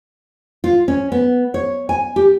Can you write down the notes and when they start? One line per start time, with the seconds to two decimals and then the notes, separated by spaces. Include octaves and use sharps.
0.64 F4
0.88 C#4
1.12 B3
1.54 C#5
1.89 G#5
2.16 G4